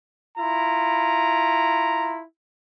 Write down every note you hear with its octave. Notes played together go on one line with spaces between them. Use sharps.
E4 F4 A#5